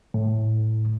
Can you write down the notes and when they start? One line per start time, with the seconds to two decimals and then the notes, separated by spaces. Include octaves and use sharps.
0.14 A2